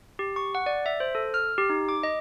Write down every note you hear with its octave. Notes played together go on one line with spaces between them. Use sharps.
G4
C#6
F#5
D5
E5
C5
A4
F6
G4
D#4
D6
D#5